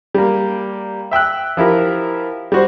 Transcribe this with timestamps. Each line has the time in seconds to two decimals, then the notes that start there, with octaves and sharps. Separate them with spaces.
0.14 G3 A#3
1.11 E5 G5 E6 F#6
1.57 F3 E4 G4 A#4
2.52 G3 F#4 C5